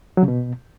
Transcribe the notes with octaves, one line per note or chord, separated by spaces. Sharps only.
F#3
C#3
B2